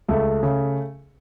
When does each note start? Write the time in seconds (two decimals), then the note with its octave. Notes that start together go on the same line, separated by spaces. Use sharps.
0.09 C#2 A3
0.43 C#3